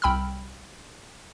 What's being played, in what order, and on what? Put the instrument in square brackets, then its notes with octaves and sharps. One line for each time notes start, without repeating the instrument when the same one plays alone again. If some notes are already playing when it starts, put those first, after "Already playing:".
[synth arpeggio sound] C2 G5 B5 E6 F6